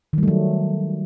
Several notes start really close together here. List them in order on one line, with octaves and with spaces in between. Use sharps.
D#3 G3 A3 F#3